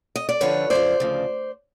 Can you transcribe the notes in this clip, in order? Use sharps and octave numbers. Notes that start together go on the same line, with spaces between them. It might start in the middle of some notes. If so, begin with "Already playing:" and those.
D#5
D5
F#2 D3 F3 B4 C#5
F#2 D3 F3 C5 D5
D2 C#3 F3